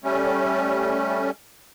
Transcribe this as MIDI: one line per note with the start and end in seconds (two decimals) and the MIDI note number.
0.04 1.31 55
0.04 1.31 57
0.04 1.31 61